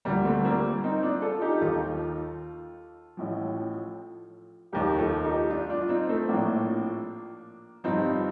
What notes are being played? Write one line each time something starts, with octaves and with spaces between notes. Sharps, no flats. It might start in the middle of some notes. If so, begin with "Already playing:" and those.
D2 D3 F3 G3 A#3
A3 C4
G3 A#3
C4 D#4
D4 F4
F4 A4
D#4 G4
D#2 D#3 F4 A4
A1 A2 F3
F1 D#2 D#3 G4 A#4
F4 A4
D#4 G4
D4 F4
D4 F4
F4
C4 D#4
A3 C4
A#1 A2 F3 A#3 D4
G1 G2 F3 C4 D#4